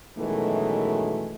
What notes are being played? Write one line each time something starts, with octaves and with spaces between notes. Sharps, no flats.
F#2 B2 D#3 E3 G#3 A3